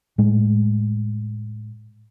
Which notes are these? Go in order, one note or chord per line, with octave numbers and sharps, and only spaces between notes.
A2 G#3